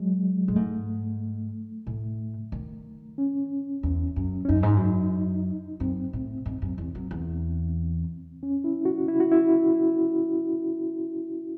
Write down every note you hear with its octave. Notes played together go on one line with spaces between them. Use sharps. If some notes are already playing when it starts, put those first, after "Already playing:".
Already playing: F#3 G#3
A2 G#3
G#2 A3
A2
D#3
C#4
E2
F#2
C#4
F#2 D#4
G#2
F#2
F#2 C4
A2
G#2
F#2
E2
F#2
E2
C#4
E4
F#4
E4
F#4
E4